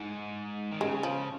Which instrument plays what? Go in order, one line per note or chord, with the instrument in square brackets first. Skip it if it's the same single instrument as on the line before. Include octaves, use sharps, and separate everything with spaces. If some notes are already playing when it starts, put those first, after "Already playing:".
Already playing: [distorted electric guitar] G#2
D#3
[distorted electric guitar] C#3 [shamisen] G#3
[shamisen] F3